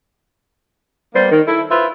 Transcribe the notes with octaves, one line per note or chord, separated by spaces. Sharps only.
G3 A#3 B3 C5
D#3
E4 A4
F4 B4 C5 E5